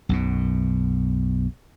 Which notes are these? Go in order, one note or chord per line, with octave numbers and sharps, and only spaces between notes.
B1 F#2 B2